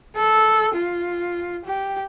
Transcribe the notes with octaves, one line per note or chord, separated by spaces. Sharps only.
A4
F4
G4